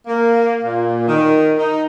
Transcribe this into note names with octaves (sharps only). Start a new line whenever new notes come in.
A#3
A#2
D#3
D#4